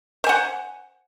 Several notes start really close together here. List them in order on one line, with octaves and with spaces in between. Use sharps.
C5 G#5 F#5